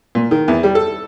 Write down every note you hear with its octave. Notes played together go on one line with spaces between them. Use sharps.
A#2
D#3
E2
G3
A4